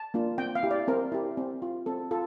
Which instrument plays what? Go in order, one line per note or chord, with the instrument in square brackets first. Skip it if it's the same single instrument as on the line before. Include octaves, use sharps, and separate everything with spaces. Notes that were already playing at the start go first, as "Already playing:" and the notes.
Already playing: [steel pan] A5
A#3 D4 F4
C4 G5
F5
E4 G4
D5
C4 A#4
E4 G4
C4
F4
C4 A4
F4 A4